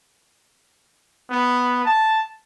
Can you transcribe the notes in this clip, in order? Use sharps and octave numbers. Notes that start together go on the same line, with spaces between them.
B3
A5